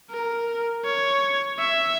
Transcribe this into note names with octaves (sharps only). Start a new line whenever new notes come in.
A#4
C#5
E5